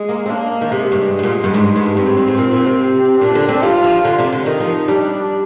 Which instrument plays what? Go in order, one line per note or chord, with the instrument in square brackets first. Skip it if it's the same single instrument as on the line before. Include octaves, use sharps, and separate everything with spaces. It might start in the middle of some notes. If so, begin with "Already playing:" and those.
Already playing: [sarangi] G#3
[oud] A#3
C4
[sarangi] A#3 [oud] D4
[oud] D#3
[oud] C3 [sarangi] G#3
[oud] G2
G#2
A#2
G2
G#2
G2
[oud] G2 [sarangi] C4
[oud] G#2
G2
G#2
A#2
A#2
C3
[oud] A#2 [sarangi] D4
[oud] D3
C4
[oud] G3 [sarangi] F4
[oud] F3
D3
C3
D3
[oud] D#3 [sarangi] D#4
[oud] F3
[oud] G3 [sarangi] D4